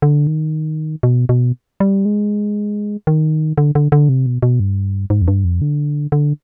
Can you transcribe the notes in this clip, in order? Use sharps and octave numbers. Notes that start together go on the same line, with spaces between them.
D3
D#3
B2
B2
G3
G#3
D#3
D3
D3
D3
C3
B2
B2
G2
G#2
F2
G2
F2
D3
D3